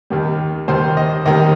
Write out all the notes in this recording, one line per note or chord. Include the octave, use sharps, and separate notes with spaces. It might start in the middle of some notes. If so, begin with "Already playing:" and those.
D#2 D#3 G3
D#2 D#3 G3 C5
D#5
D#2 D#3 G3 D#5